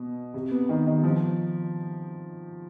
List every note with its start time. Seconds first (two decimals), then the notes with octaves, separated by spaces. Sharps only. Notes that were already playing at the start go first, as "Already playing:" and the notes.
Already playing: B2
0.34 C3
0.51 B3
0.69 D#3
0.86 D#3
1.04 F3